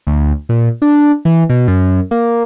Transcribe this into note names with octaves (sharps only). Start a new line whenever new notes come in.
D2
A#2
D4
E3
B2
F#2
A#3